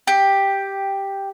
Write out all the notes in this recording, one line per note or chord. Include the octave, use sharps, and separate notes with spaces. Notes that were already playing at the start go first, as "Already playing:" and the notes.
G4